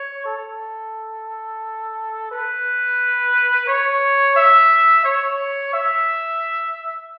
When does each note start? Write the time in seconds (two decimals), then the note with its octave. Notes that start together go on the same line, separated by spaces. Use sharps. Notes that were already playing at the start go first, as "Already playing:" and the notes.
Already playing: C#5
0.26 A4
2.32 B4
3.67 C#5
4.36 E5
5.04 C#5
5.74 E5